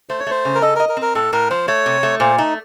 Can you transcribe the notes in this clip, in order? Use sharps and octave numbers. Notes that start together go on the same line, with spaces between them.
A3 C5
C#5
A3 C5
C#3
A#4
A4 D#5
A#4 D#5
A#4
C4
A#4
A2 A4
A2 A#4
F3 C5
A3 C#5
C3
A3
A#2 C5
A3 D#4